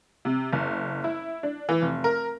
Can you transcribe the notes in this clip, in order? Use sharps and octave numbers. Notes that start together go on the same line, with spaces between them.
C3
F#1
E4
D4
E3
F1
A#4